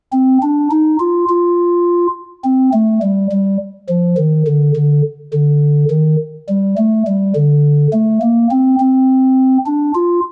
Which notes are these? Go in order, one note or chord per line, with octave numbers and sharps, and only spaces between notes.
C4
D4
D#4
F4
F4
C4
A3
G3
G3
F3
D#3
D3
D3
D3
D#3
G3
A3
G3
D3
A3
A#3
C4
C4
D4
F4